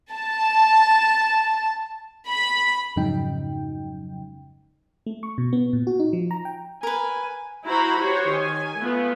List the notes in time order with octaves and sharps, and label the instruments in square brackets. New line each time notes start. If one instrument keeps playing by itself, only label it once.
[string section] A5
B5
[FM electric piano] F2 G#2 C#3 F#3 D#4 G5
A3
C#6
B2
B3
A#2
F#4
D#4
F3
A#5
G5
[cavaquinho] A#4 B4 [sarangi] G#5
[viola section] E4 F#4 C5 A#5 B5
F#4 G4 C5 C#5
D#3 G#5
A3 B3 F4